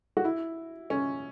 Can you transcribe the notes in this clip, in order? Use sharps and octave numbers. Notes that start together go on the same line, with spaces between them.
F#4
E4
C#4